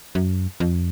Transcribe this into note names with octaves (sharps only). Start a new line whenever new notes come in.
F#2
F2